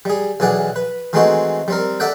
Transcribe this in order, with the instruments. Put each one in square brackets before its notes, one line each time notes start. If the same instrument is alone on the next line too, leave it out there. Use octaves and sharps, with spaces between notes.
[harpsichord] G3 G#4
B1 E3 G#4 D5 F#5
B4
E3 G#3 A3 C4 D#4 F#4
G3 C4 A#4
A4 D5 E5 F#5 G5